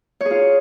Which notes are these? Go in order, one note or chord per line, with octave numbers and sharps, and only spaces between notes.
C#5
G#4
F4